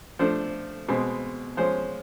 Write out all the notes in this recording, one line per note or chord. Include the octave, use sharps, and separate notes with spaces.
F3 A3 D4 C5
B2 G#3 C4
F3 G#3 C#4 C5